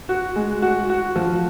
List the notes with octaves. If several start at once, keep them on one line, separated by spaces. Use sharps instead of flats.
F#4
G#3
F#4
F#4
F3